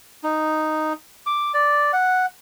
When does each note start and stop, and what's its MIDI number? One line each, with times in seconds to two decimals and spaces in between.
0.24 0.93 63
1.26 1.52 86
1.54 1.92 74
1.93 2.26 78